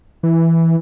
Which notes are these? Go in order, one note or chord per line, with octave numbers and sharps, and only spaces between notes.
E3